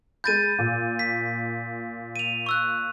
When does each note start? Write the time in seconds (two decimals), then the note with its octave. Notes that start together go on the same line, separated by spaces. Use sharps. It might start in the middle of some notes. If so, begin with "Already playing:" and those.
0.24 G#3 B5 G6 A6 D#7
0.59 A#2
0.99 B6
2.16 D#7 F7
2.46 C#6 E6 F#6